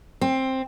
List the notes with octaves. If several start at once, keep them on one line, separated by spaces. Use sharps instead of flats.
C4